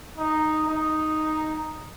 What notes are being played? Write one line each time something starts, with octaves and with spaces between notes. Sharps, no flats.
D#4
D#4